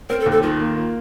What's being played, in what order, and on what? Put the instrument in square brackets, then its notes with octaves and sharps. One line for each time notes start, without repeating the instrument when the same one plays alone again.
[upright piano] C4 [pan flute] A#4
[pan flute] A4
[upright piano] D#2
[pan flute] A4
[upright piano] D#3 [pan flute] F4
[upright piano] A#3
A#3